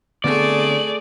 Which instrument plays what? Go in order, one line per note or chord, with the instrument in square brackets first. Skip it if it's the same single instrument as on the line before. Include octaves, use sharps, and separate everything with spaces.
[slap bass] D3 B3 C4 [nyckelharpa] A3 G#4 [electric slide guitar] D5